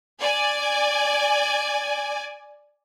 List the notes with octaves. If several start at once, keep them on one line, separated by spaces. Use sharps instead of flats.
D5 G#5